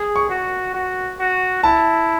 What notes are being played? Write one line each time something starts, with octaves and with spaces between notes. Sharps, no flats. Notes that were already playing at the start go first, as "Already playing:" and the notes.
Already playing: G#4
C#6
F#4
F#4
F#4
E4 A5